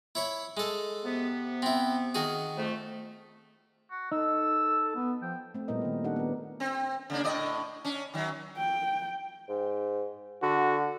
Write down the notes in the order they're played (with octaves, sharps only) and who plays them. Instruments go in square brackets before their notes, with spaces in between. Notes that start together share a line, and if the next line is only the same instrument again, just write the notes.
[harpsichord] E4 C#5 B5
G#3 A4
[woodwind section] C3 B3
[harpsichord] C4 E4
D#3 F#4 G#4
[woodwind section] F2 A3
[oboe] F#4
[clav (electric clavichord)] D#4 [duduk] A4 [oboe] E6
[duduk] B3
[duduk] F3 [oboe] G5
[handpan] A3 C4
A#2 G3 B3 E4 A#4 D#5
D#3 B4
D4 D#4 G4 A4 D#5 F#5
B3 A#4
[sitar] C4
C#3 A#3 D4
A2 D5 D#5
C#4 D4
D#3 F#3
[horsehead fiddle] G5
[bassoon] G#2
[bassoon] D3 [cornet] F#4